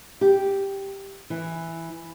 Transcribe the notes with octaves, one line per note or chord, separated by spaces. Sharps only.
G4
E3